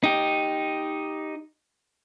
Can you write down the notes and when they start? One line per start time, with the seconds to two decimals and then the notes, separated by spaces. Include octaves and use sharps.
0.04 D#4 G4